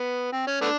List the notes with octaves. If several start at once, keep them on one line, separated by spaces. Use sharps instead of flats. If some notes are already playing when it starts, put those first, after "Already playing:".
Already playing: B3
C4
C#4
A3 B3 D4